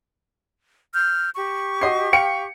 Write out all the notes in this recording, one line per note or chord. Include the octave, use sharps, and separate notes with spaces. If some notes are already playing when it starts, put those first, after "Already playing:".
F6 G6
G4 C#6
F#4 D#5 C7
F5 G5 C#7